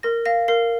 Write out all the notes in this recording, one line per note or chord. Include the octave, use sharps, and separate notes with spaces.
A#4 A#6
F5 A#6
A#4 C7